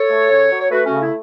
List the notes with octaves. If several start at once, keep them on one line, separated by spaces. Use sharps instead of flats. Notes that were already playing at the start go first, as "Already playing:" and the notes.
Already playing: A4 C#5
A3
C#3
F#3
C#5
A3 F#4 B4
C#3 C#4 F#4
E4